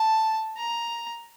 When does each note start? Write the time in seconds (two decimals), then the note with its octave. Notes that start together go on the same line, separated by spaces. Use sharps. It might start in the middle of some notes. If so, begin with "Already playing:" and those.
Already playing: A5
0.57 A#5